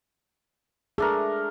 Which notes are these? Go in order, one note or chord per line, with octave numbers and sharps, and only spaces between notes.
A3 D4 G#4 A#4